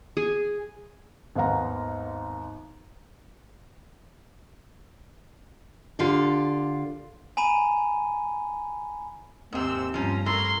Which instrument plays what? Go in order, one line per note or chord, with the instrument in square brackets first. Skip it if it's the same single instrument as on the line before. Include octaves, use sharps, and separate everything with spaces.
[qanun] G#4
[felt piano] G#1 D#2 B3 F5 F#5 A#5
[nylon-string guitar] D3 F4 G4 A4
[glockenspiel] G#5 A#5 B5 D#7
[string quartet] D#2 C3 E6 [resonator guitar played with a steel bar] G#2 C4
[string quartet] G2 A#5 [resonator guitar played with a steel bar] F3 C#4
[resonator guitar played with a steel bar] A2 [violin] A#4 C6